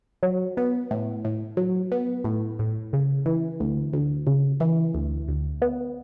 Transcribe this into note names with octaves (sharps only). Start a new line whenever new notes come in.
F#3
B3
A2
A2
F#3
B3
A2
A2
C#3
E3
D2
D2
C#3
E3
D2
D2
B3